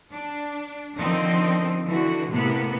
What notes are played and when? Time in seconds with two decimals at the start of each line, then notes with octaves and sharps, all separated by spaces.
0.12 D4
0.97 D3 D#3 F3 C4 D#4
1.86 D3 E3 F#4
2.30 A2 C3 A#3 B3